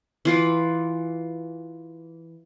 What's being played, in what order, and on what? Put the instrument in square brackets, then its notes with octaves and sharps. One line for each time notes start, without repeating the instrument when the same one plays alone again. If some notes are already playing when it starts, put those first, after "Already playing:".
[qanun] E3 F4 B4